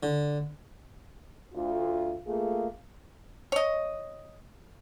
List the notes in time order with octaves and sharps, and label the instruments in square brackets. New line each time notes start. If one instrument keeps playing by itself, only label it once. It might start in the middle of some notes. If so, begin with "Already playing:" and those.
[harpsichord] D3
[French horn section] D2 F4
A3 A#3 F4 G#4
[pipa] C#5 D#5